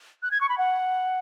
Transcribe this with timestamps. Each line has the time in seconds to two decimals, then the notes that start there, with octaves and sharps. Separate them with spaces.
0.23 F#6
0.31 G#6
0.41 C#6
0.49 B5
0.58 F#5